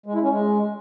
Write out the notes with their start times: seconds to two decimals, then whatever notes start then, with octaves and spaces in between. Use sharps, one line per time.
0.06 G#3
0.14 E4
0.22 C#4
0.30 G#3